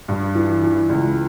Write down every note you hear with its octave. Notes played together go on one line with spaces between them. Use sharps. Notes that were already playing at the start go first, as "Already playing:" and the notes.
G2
E3
E3
C#2